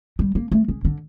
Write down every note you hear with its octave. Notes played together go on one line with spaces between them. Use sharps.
G3
A#3
A3
C#3
D3